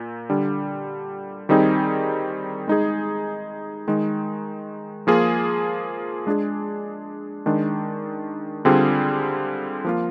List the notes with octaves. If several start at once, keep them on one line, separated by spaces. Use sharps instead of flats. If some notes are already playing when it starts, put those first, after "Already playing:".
Already playing: A#2
D3 G3 D4
D#3 G3 C4 D#4 G#4
G#3 D#4 G#4
D#3 G#3 D#4
F3 A#3 F4 G#4
G#3 D4 G#4
D#3 G#3 D4
D3 G3 C4 F4 G#4
F3 A#3 F4